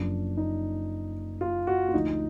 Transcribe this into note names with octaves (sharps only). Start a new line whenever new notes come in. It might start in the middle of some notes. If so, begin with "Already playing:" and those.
Already playing: F#1 F#2 F3 D4
D#4
F4
F#4
F4
D2 D3 F3 D#4